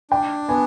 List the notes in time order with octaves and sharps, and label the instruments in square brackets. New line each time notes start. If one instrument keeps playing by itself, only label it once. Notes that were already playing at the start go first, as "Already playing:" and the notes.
[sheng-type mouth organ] D4 [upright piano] G5
[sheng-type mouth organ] B3 [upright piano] G#5